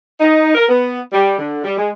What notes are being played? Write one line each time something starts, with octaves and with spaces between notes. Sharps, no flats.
D#4
A#4
B3
G3
D3
G3
G#3